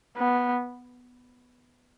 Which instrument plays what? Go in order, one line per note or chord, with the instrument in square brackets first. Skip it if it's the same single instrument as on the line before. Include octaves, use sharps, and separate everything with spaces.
[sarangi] B3